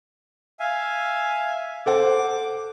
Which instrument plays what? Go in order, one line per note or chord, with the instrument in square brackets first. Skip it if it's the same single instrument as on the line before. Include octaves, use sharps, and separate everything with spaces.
[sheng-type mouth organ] E5 F5 G#5
[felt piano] A4 C5 F#5 [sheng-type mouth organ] D6